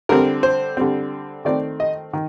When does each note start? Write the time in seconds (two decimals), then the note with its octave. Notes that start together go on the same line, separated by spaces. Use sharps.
0.09 D3 G3 C4 A#4
0.43 C5
0.77 D3 G3 C4
1.45 D#3 A3 C4 D5
1.80 D#5
2.13 D#3